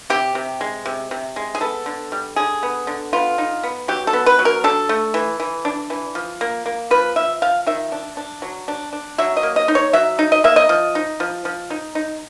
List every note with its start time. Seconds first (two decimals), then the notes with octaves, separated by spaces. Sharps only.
0.10 C3 G4
0.35 C3
0.61 G#3
0.86 C3
1.11 C3
1.36 G#3
1.55 G#4
1.61 B3 A4
1.86 D3
2.12 G3
2.36 D3 G#4
2.63 B3
2.87 D3
3.13 B3 F4
3.38 D#4
3.63 B3
3.88 F#3 G4
4.07 A4
4.13 B3
4.26 B4
4.39 F#3
4.45 A#4
4.64 D4 A4
4.89 A3
5.14 E3
5.40 E3
5.65 D4
5.90 E3
6.15 F3
6.41 A#3
6.66 A#3
6.91 F3 B4
7.16 F3 E5
7.42 F3 F5
7.67 D#3 E5
7.92 D4
8.17 D4
8.42 F#3
8.68 D4
8.93 D4
9.18 F#3 E5
9.37 D#5
9.43 A#3
9.56 D#5
9.68 D#4
9.75 C#5
9.93 F#3 E5
10.19 D#4
10.32 D#5
10.44 A#3 E5
10.56 D#5
10.69 F3
10.95 D#4
11.20 F3
11.45 F3
11.70 D#4
11.95 D#4